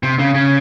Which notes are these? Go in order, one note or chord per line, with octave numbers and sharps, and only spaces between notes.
C3
C#3
C#3